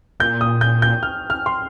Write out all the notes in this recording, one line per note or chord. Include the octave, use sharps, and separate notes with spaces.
A#2 G6
D#6
G6
G6
F6
F6
C6